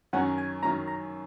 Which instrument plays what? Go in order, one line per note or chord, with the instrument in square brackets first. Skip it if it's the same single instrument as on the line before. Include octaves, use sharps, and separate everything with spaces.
[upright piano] F#2 D#3 F#3 C#4 [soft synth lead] F#5
[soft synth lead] G#5
[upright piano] F#2 D#3 F#3 C#4 [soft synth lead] A#5
[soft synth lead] A#5